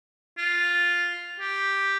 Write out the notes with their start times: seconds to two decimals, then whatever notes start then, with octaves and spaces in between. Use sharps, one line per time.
0.38 F4
1.40 G4